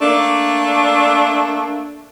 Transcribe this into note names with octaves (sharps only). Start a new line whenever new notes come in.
A3 A#3 D4